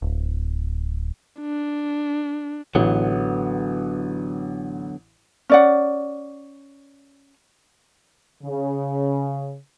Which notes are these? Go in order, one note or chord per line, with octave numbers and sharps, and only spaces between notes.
D1
D4
A1 D3 F#3 B3
C#4 D5 F#5
C#3